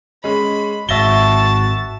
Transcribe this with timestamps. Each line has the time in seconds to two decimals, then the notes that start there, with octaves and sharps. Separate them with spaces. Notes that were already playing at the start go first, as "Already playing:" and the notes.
0.24 G#3 C#4 B5
0.89 G#1 G#2 F#4 E5 A5 A#6 G7